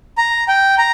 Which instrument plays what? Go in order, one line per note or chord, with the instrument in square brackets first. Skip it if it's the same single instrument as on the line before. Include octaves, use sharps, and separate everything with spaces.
[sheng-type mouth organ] A#5
G5
A#5